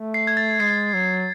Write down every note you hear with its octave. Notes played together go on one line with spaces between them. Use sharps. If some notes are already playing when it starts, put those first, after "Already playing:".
Already playing: A3
C7
G#6
A6
G#3 C7
F#3